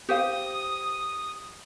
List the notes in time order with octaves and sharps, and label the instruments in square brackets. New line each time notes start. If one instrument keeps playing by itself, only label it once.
[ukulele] G4 C5 F5 [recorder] D#6